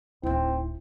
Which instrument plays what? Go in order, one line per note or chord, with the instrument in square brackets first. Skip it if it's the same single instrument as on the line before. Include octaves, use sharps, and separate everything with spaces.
[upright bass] D1 D#4 [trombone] C4 [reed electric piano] E4